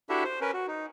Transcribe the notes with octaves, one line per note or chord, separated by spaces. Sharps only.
D4 E4 F#4 G4 A4 E5
C5
C#4 A#4 B4
F#4
D#4